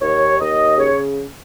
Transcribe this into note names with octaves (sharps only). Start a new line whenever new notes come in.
D#2 C#5
D#2 D#5
C#3 C#5